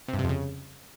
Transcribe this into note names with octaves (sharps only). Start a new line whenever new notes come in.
C3
G2
C3
F2
C#3